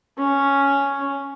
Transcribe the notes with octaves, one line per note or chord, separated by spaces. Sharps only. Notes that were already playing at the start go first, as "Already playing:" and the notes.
C#4